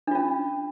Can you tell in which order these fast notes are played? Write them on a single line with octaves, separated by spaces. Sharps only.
D4 F4 C#4